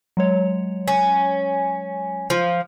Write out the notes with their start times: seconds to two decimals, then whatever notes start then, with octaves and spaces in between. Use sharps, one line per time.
0.17 F#3 G#3 C#5
0.88 C#4
2.30 F3